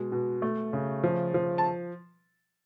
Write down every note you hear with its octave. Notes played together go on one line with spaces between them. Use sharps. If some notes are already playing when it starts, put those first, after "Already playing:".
Already playing: B2 G#3
B2
A3
C#3
F3
F3
A5